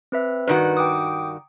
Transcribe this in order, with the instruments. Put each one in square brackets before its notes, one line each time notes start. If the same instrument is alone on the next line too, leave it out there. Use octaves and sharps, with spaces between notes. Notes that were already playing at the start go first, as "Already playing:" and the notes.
[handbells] C4 B4 E5
[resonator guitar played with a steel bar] G2 D#3 F#4 [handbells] B4
[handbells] G5 D6 D#6